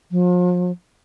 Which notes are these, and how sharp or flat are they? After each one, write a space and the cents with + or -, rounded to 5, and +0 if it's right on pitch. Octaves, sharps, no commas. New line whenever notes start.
F3 +40